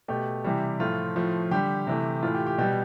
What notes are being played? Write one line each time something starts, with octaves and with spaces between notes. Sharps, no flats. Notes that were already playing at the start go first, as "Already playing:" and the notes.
B2 A3 G4
C3 E3 G3
A2 F3 A3 F4
A2 F3 A3
D3 G3 G4
C3 E3 A3
A2 E3 A3 F4
G4
G4
B2 G3 G4